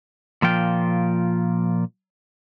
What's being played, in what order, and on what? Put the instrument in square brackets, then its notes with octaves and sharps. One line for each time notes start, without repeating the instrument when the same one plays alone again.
[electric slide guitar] A#2 F3 F4 G5